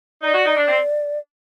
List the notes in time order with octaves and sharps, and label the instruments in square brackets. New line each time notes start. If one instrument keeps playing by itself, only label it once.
[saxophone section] D#4 [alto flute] D5
[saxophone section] F#4
D#4
D4
C4